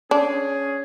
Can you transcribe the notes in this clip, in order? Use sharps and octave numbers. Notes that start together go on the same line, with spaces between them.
C#4 D4 G#4